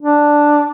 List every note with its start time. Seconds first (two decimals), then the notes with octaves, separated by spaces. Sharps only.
0.02 D4